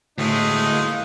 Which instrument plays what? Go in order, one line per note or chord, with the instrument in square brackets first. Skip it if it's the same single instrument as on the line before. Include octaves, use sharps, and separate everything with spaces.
[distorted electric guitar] D2 G#3 [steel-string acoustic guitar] A2 [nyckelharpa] A3 [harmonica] D#4
[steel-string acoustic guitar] A#3